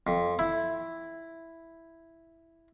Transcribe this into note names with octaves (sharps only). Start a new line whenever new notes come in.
F2
E4